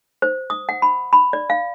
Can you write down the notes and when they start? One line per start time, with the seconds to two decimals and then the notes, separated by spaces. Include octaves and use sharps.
0.22 C5
0.50 D#6
0.69 F#5
0.82 B5
1.13 B5
1.33 D5
1.50 F5